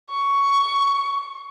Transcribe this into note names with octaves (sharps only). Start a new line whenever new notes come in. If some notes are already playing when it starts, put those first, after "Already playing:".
C#6